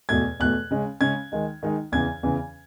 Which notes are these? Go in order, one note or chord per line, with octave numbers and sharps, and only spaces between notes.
E2 B2 A3 G#6
E2 B2 A3 F#6
C#3 G#3 C#4
C#3 G#3 C#4 G#6
D#3 G#3 D#4
D#3 G#3 D#4
E2 C#3 E3 G#6
E2 C#3 E3